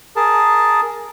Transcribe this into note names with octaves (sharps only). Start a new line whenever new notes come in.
G#4 A#4 A5